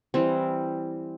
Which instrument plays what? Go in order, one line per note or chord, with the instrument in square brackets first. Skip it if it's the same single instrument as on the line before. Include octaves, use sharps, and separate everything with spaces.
[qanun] E3 G3 C4